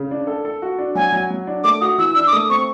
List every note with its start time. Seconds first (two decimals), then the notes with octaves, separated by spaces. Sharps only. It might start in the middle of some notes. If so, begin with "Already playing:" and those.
Already playing: C#3
0.11 D4
0.27 A4
0.45 A4
0.62 F#4
0.78 D4
0.95 F#3 G#5
1.12 F#3
1.30 F#3
1.47 D4
1.64 A3 D6
1.81 F#4 D#6
1.98 E3 E6
2.15 D4 E6
2.27 D6
2.33 A3 D#6
2.50 C4 C#6